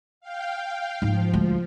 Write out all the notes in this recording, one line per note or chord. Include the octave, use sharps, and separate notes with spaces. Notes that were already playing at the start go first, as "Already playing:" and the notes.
F5 G5
G#2 F3 D#4
D2 G#3